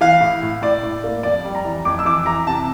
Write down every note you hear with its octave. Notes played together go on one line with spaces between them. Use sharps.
E3 F5
A2
A2
A2 D5
A2
A#3
F2 D5
G3
A#5
E3
F2 D6
E6
E3 D6
E3 A#5
C3 A5